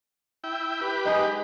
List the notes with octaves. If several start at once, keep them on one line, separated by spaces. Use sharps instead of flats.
E4 G5
G4 B4
G#3 D#4 G#4